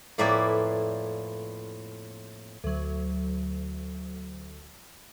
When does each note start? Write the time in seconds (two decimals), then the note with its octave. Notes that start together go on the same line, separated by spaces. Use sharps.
0.18 F2 A2 A#3 E4 B4 D5
2.64 D2 F#3